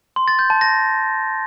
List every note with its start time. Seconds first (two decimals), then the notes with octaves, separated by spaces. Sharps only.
0.16 C6
0.28 A6
0.39 G6
0.50 A5
0.61 A#6